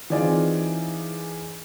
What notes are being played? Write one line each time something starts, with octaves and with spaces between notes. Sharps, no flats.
E3 C4 D#4 F4 G#4 D5